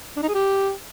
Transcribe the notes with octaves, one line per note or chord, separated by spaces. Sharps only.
D4
D#4
G#4
G4